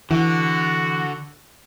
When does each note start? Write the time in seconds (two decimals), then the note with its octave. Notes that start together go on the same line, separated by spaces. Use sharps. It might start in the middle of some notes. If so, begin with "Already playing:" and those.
0.11 D3 E3 F#4